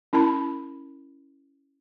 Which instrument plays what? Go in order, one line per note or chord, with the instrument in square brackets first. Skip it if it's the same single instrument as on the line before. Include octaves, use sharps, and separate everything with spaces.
[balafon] C#4 E4 A#4 A5 B5